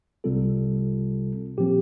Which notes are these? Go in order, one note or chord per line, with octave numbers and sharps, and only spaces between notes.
C2 C3 G3 C4 F4 A4
A#2 F3 C4 G4